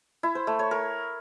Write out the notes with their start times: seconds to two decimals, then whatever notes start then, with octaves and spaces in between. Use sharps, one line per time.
0.23 E4
0.35 C5
0.47 A3
0.59 C#5
0.71 A#4